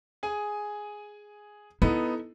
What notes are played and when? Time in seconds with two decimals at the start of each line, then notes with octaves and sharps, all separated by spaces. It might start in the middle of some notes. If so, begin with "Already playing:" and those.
0.23 G#4 G#5
1.82 B3 D#4 E4 A4